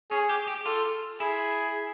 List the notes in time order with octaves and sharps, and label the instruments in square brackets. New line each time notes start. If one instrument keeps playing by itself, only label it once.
[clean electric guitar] C#4 [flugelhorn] G#4
[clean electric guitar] G4
G4
[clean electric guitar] F4 [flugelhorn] A4
[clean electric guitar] E4 [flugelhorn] G#4